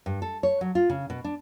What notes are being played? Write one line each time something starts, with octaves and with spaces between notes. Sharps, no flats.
G2
A4
C#5
F#3
F4
C#3
B2
D4